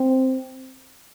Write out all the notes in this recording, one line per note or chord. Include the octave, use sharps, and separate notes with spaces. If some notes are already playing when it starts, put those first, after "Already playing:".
Already playing: C4